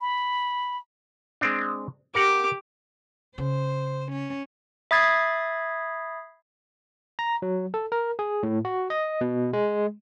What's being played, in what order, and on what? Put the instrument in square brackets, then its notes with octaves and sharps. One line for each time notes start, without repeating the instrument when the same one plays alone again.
[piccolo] B5
[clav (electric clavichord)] G#3 C4 D4
[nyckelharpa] G4 D6 [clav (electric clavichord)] A#4 F#5
[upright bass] C#3 [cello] C5
[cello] C#4
[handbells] E5 B5 D#6 G#6 A6 C7
[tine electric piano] A#5
F#3
A4
A#4
G#4
A2
F#4
D#5
B2
G#3